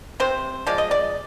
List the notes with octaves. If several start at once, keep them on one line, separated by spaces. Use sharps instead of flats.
C3 C5
F3 G#3 D5
D#5
D5